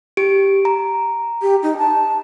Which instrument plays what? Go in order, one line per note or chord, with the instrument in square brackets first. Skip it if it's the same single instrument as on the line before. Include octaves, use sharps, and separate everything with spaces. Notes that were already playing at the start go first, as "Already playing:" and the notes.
[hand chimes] G4 D7
A#5
[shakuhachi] G4
D#4
A5